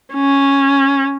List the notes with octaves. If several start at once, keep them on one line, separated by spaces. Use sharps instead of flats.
C#4